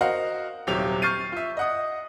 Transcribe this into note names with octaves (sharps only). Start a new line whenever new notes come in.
F#4 A#4 C5 D#5 F5 F#5
D#1 C2 F#3 G4 E5 F7
C#6 F6 G6 A6 C7 D#7
F4 E5
D#5 F#5 D#6